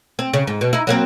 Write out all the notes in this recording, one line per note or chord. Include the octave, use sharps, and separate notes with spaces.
C4
C#3
G#2
B2
D#4 E4
F#3 A#3 C4